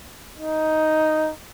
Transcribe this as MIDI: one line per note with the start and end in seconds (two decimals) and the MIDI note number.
0.38 1.30 63